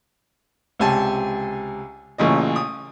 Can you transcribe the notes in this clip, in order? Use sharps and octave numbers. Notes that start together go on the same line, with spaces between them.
C#2 C3 G#5 A5
A1 A#2 C#3 D#5
D#6